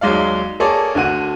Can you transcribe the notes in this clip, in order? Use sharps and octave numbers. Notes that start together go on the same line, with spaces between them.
D#2 F#3 G#3 D5 F5
A#3 G#4 A4 C#5 D5
D2 D3 F#4 D#7